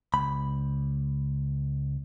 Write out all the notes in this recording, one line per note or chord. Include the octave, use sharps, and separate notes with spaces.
C#2 B5